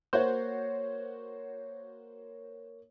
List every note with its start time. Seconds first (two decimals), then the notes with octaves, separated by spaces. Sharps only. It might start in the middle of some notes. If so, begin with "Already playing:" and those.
0.13 A#3 F#4 C5 C#5